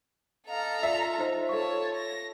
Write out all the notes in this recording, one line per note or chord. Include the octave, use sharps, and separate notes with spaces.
A4 D#5 F5 A#5
F4 D5 E5
D#4 C5 D#5
A4 C#5 F5 A5 C#6
A#6